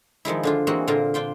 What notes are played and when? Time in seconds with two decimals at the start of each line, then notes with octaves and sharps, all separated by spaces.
0.25 D#3 F3 G#3 E4
0.43 D3 D4 F4
0.67 E3 G#3 A#3 C4 F#4
0.88 A#2 D3 A#3 F4 A#4 A#5
1.14 D4 F4 G5 C6